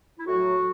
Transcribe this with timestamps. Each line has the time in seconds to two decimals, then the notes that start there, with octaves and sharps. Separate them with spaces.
0.17 E4
0.26 A2 F#3 F#4